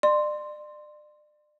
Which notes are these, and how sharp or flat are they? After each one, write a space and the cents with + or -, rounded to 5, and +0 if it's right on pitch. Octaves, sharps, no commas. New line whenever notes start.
D5 +35 C6 +0